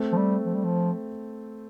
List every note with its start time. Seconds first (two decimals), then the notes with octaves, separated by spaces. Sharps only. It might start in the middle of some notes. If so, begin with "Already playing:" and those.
Already playing: A3 C4
0.12 F3
0.17 G3
0.46 F3
0.55 G3
0.65 F3